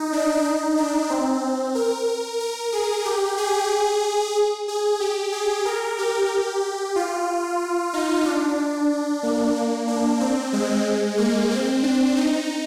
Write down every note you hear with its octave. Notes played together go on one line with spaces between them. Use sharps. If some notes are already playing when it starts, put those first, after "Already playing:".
Already playing: D#4
D4
D#4
D4
C4
C4
A#4
A#4
G#4
G4
G#4
G#4
G4
G#4
A#4
G4
F4
D#4
D4
A#3
A#3
D4
C4
G#3
A#3
C4
D4
D#4